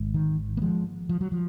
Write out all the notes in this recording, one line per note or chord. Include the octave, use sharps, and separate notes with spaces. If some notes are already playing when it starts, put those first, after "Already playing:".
Already playing: G#1 G#2
D#3
A#3
F3 G#3
F3
F#3
F3